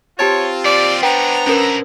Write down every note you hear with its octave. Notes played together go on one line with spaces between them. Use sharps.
C4 F4 G4 C#5 A5 A6
D#2 G3 D5
G3 B3 C#4 D4 C5 G5 A#5
B1 C#4 E4 A#4 B4